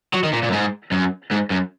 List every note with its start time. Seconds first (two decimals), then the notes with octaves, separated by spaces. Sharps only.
0.14 F#3
0.24 D#3
0.33 A#2
0.43 A#2
0.49 F#2
0.53 G#2
0.92 F#2
1.31 G#2
1.50 F#2